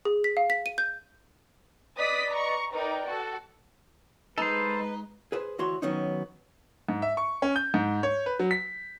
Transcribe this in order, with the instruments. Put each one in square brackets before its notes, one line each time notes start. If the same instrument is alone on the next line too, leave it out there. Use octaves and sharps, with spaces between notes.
[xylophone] G#4
B6
F5
B6
D#7
G6
[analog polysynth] B4 D5 D#5 [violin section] D#6 B6
[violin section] A#5 C#6
[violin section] D#4 A#4 G5 [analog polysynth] B4 D5
[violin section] F#4 A4
[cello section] G#3 [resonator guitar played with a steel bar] D#4 [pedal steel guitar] A4 C5 [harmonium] B4
[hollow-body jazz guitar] G#4 B4 C5
D2 E3 F#4 C#5 C6
D#3 F#3 B3 C#4 D#4
[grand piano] G#2
E5
C#6
C#4
G6
G#2
C#5
B4
F#3
B6